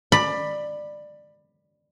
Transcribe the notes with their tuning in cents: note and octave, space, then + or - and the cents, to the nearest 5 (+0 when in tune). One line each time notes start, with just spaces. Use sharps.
D5 +20 B5 +0